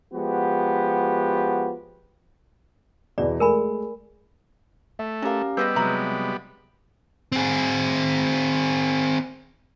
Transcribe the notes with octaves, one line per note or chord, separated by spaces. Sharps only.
F3 G#3 B3 F#4 G4
E2 B2 E3 D5
G#3 A3 A#4 G#5 B5
A3 E5
F#3 C#4 G4 A#4 F5
G3 B3 G#4 B4 C5 D#5 E6 G6
C3 F#3 G#3 E5 A#5 B5
C4 G#4